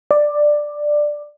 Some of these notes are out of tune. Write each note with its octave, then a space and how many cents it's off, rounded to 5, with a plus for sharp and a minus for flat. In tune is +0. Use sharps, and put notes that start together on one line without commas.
D5 +10